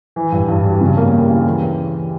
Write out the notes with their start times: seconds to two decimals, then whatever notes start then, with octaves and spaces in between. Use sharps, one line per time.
0.16 E3
0.32 G2
0.48 G2
0.64 G3
0.81 C#3
0.97 A#3
1.13 D#2
1.30 E3
1.46 E3